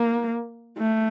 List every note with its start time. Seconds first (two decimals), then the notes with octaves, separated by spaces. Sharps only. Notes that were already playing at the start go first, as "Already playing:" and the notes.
Already playing: A#3
0.78 A3